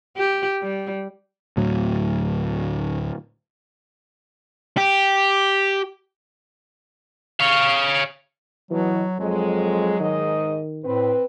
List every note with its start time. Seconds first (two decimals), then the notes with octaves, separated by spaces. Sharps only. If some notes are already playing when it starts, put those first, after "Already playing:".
0.17 G4
0.63 G3
1.57 D2 A2 F#3
4.77 G4
7.40 C#5 F5
8.71 B2 E3 F#3
9.19 F2 F#3 G#3
10.00 G#2 D#3 D#5
10.84 A2 C4 B4